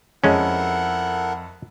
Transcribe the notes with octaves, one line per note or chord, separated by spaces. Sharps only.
F2 G#3 C#4 E4 A4 A#4 F#5